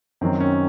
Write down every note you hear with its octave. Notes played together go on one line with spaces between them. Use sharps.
F#2 D#3 F#3 C4
C#4